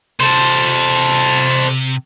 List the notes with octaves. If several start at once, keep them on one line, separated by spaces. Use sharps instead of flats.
C3 A4 C5